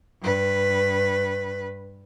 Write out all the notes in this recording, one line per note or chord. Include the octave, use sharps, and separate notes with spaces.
G2 B4